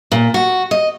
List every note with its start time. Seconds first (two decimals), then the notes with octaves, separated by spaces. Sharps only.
0.12 A#2
0.34 F#4
0.71 D#5